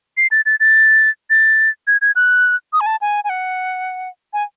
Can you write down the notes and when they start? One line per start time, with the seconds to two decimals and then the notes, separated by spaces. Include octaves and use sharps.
0.17 C7
0.31 A6
0.46 A6
0.60 A6
1.30 A6
1.87 G#6
2.02 G#6
2.16 F#6
2.73 D#6
2.81 G#5
2.86 A5
3.01 G#5
3.24 G#5
3.30 F#5
4.33 G#5